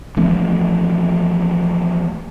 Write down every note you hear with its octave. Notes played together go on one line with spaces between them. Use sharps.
E3 F3 A3 C4